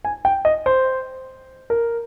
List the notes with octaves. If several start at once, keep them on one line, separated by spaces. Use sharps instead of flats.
G#5
G5
D#5
C5
A#4